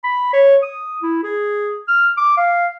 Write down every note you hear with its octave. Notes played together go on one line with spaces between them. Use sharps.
B5
C#5
D#6
E4
G#4
F6
D6
F5